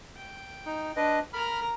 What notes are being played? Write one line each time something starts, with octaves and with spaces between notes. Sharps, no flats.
G5
D#4
D4 B4 D#5
A#4 A#5 B5 F6